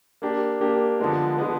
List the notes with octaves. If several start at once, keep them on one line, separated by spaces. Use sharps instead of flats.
A#3 D4 G4
A#3 D4 G4
D3 F3 G#3 B3
D3 F3 G#3 B3